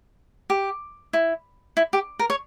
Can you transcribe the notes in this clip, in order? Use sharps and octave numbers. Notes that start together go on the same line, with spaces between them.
G4
E4
E4
G4
A#4
C#5